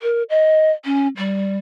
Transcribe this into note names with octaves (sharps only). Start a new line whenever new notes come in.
A#4
D#5
C#4
G3